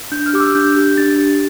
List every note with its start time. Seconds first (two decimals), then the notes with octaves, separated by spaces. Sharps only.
0.12 D4 G6
0.26 F6
0.33 G4 D6
0.40 E6
0.55 D4 G6
0.76 G4
0.98 D4 A6
1.18 G4